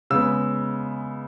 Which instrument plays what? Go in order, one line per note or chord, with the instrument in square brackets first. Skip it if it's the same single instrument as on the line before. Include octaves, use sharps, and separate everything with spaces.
[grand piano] C#3 G#3 B3 E6